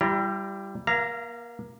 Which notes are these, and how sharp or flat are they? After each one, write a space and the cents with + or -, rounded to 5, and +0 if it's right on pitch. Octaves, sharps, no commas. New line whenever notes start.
G3 +0 E4 +40 A#5 +0
A#3 +30 F5 -30 A#5 +0